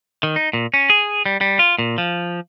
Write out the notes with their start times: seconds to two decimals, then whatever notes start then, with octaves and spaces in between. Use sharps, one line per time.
0.23 D#3
0.36 D#4
0.53 A#2
0.74 C#4
0.90 G#4
1.26 G3
1.41 G3
1.59 F4
1.79 A#2
1.98 F3